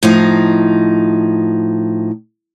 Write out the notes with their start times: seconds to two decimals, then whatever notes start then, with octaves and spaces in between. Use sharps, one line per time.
0.03 A2 F3 D#4